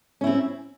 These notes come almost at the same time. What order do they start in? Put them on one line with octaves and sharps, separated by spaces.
C#4 E4 C4